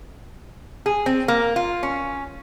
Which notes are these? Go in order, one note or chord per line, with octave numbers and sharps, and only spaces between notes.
G#4
C4
A#3
F4
C#4